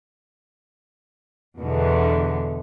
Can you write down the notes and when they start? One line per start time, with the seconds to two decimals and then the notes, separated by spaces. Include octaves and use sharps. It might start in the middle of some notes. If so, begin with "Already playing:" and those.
1.59 E2 B2 D3